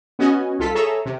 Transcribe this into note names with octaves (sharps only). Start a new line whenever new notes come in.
B3 C#4 F#4 D#5 G#5
C2 F4 A4 B6
G#4 A4 C#5 E5 A#5 E6
C3